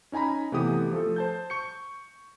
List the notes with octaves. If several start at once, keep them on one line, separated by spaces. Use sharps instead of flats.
C#4 D#4 G#5 A#5 B5
C3 E3 A3 B3 G4 D#6
F3 A3 A4
C5 A5 G6
C#6 G6 C#7